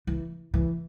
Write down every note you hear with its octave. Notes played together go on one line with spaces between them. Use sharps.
E3
E3